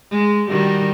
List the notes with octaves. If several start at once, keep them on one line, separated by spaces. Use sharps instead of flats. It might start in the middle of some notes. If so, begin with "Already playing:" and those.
G#3
D#3 G3 F#4